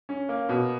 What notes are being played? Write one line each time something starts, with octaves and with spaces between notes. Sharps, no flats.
C#4
A#3
B2